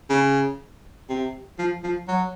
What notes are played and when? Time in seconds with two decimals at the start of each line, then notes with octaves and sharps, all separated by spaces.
0.10 C#3
1.09 C3
1.59 F3
1.83 F3
2.08 F#3